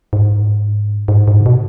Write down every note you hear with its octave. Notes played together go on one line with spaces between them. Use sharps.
G#2
G#2
G#2
C#3
B2